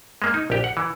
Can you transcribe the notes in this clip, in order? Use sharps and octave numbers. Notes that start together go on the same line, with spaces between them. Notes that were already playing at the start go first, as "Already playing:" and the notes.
G#3 A#3
D#4
A#1 G4
F#5
E3